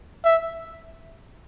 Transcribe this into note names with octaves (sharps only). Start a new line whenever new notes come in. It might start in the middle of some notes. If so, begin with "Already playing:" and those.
E5